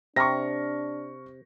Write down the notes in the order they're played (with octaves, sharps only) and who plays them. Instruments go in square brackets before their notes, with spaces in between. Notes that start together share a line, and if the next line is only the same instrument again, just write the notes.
[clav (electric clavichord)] C3 [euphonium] D4 [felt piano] C#6 F6 A#6